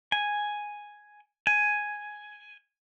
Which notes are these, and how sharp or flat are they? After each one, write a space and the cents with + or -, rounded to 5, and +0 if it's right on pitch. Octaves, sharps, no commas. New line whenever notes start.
G#5 +0
G#5 +5